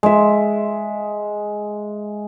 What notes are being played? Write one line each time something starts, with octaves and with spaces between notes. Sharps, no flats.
G#3 E5